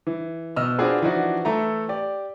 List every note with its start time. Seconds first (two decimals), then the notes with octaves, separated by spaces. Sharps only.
0.07 E3
0.56 B2 D#5 E6 F6
0.78 C4 D4 F4 F#4 G#4 B4
1.02 E3 F3 D4 D#4 F#4
1.45 E3 A3 E4 A4 A#5
1.89 G4 D5